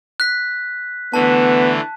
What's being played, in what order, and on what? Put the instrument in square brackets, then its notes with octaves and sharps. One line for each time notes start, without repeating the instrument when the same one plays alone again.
[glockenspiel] F#6 B6
[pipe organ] D3 E3 A3 [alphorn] B3 [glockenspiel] A5